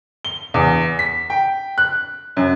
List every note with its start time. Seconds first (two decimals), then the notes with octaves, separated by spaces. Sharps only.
0.25 G7
0.54 E2
0.99 B6
1.30 G5
1.78 F#6
2.37 F#2